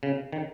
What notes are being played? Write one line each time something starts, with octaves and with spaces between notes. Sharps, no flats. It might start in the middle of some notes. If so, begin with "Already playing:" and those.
C#3
D#3